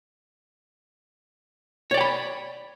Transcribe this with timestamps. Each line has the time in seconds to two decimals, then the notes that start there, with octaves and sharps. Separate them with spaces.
1.91 C#5
1.94 D5
1.97 G5
2.01 B5